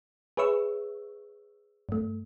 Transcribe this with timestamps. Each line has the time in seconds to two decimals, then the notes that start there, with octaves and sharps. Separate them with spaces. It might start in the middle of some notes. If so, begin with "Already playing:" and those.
0.37 G#4 B4 C#5 E5 C#6 E6
1.89 G2 A3